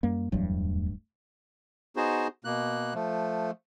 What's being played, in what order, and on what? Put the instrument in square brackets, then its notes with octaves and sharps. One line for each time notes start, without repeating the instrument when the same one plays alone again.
[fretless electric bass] F#2 G3 A#3
[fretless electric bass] D1 G2 F#3 [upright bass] E2 A3
[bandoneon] B3 D#4 F#4 G#4 C5
B2 A#3 F#6
F3 A3